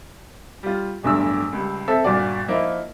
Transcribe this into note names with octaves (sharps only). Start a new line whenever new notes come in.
G3 F4
D1 E2 G2 D3 E6
C#2 G3
C4 A4 E5
G1 A#2 F#4 D5
F3 A#3 D#4 E4